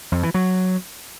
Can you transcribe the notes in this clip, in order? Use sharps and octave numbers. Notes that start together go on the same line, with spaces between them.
F2
E3
F#3